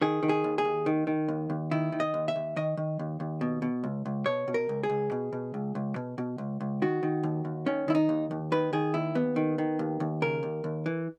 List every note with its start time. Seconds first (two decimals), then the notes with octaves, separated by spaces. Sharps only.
0.02 D#3 G#4
0.23 D#3
0.29 G#4
0.44 D#2
0.58 G#4
0.65 D#2
0.86 D#3
1.07 D#3
1.28 D#2
1.50 D#2
1.71 D#3 E4
1.92 D#3
2.00 D#5
2.14 D#2
2.28 E5
2.36 D#2
2.56 D#3 D#5
2.77 D#3
2.99 D#2
3.20 D#2
3.41 B2
3.62 B2
3.84 C#2
4.06 C#2
4.26 B2 C#5
4.48 B2
4.54 A#4
4.69 C#2
4.83 G#4
4.90 C#2
5.12 B2
5.33 B2
5.54 C#2
5.75 C#2
5.96 B2
6.18 B2
6.38 C#2
6.60 C#2
6.82 D#3 F#4
7.03 D#3
7.23 D#2
7.45 D#2
7.66 D#3 C#4
7.88 D#3 E4
7.95 D#4
8.09 D#2
8.31 D#2
8.52 D#3 B4
8.73 D#3 G#4
8.94 D#2 E4
9.15 D#2 B3
9.36 D#3
9.58 D#3
9.79 D#2
10.00 D#2
10.22 C#3 A#4
10.43 D#2
10.64 D#2
10.86 E3